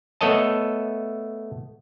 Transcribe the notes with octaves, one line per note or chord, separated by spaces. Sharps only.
A3 B3 A4 C#5 D#5 A5